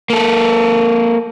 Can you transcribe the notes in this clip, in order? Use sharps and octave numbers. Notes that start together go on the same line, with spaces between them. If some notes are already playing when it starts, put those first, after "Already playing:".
A#3 A4